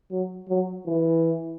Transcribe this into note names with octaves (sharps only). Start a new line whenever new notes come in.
F#3
F#3
E3